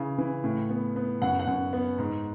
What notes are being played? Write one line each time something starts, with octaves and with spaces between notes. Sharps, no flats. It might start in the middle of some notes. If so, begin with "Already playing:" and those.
Already playing: C#3 E3
E3
A2
B3
B3
F#2 F#5
F#5
F#2
B3
G#2